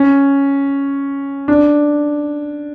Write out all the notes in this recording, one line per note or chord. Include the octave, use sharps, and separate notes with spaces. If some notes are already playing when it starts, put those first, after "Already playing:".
Already playing: C#4
D4